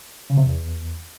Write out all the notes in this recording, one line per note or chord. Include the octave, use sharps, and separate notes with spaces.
C#3
C3
E2